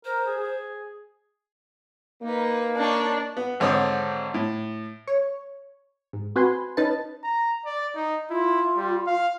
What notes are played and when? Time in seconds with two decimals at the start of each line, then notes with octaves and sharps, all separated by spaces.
0.05 A#4 C5
0.26 G#4
0.38 G#4
2.23 A#3 D#4 B4
2.77 D4 D#4 C#5
3.37 B3
3.60 G#1 D3 C4 C#5 D#6
4.34 A2
5.08 C#5
6.13 G#2
6.36 C4 F#4 B4 G#5 C6
6.77 C#4 D#4 B4 A5
7.23 A#5
7.66 D5
7.95 D#4
8.30 E4 F4
8.76 G3
9.06 F5